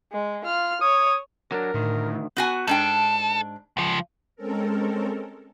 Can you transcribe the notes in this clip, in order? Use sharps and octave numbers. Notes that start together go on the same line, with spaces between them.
G#3
F4 F6
C#5 D#6
F#3 D4 A#4
D2 A2 D#3
B3 F#4 G#5
G#2 D4 A4 G5
C#2 F3
G#3 C4 C#4 A4 A#4